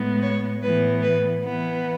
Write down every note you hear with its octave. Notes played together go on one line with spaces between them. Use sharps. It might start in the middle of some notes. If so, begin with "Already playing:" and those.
Already playing: A2 G#3 B3
C#5
A2 E3 B3 B4
B4
E3 B3